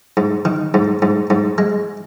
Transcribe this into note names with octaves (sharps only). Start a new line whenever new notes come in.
G#2
D#3
G#2
G#2
G#2
G#3